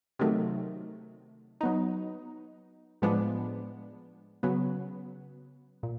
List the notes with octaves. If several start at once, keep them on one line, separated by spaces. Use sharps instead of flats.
C3 D#3 F#3 A3
F#3 B3 D#4
A2 F3 G#3 B3 D4
C#3 F#3 B3
A#2